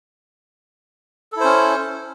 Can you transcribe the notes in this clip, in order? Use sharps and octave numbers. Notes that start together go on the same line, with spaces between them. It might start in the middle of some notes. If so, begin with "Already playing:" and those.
C#4 E4 A4 C5